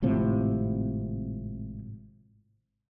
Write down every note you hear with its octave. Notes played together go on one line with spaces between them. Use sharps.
G#1 A2 C3 F3